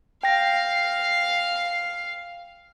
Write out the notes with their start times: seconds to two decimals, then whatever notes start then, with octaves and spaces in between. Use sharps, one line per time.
0.23 F5 G5 A#6 C7